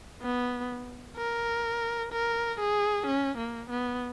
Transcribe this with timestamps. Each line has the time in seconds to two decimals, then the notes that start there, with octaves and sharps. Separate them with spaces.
0.22 B3
1.17 A#4
2.13 A#4
2.60 G#4
3.07 C#4
3.38 A#3
3.70 B3